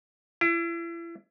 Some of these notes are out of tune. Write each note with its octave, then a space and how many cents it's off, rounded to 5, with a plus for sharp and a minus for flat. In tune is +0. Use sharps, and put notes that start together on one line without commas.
E4 +35